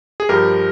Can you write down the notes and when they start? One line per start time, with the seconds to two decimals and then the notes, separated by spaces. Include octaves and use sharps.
0.20 G#4
0.29 G2 F3 G4 A#4